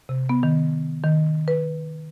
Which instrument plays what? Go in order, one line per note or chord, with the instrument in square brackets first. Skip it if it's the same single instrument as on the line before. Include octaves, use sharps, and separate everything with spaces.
[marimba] C3
B3
D#3
D#3
B4